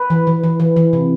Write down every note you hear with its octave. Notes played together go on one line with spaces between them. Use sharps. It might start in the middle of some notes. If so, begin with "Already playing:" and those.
Already playing: B4
E3
E3
E3
E3
E3
C3